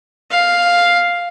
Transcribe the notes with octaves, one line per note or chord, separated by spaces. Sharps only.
F5